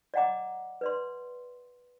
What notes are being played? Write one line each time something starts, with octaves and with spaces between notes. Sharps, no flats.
D5 D#5 F#5 G5 A#5 D6
B4 D5 C6